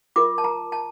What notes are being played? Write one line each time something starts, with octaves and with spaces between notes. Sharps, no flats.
F4 A#4 D6
A5
A#5
A5